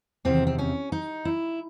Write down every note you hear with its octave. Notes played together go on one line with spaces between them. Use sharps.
E2 C3 D#3 C4
C4
C#4
D#4
E4